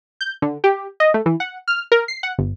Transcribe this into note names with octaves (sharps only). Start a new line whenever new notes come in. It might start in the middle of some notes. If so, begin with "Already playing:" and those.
G6
D3
G4
D#5
A3
E3
F#5
F6
A#4
C7
F#5
G1